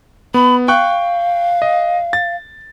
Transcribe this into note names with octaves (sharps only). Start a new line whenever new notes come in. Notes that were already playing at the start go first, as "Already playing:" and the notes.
B3 B5
F5 G5 C#6 F#6
D#5
A6